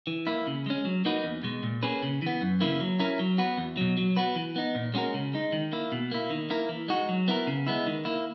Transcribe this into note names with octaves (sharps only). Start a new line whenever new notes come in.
E3
A#3 E4
C#3
G#3 C#4
F#3
A#3 D#4 F#4 B4
E2
B2 G#3
A#2
A#3 C#4 G#4 B4
C#3
E3 B3
F#2
C#3 E3 A#3 E4
F#3
C#4 E4 A#4
F#3
B3 F#4 B4
E2
B2 F#3
F#3
B3 F#4 B4
E3
B3 D#4
A#2
G#3 C#4 F#4 A#4
C#3
G#3 D#4
D#3
A#3 E4
B2
A#3 E4
D#3
A#3 E4 A#4
E3
G#3 D#4 F#4
F#3
B3 E4 A#4
C#3
G#3 B3 E4
D#3
A#3 E4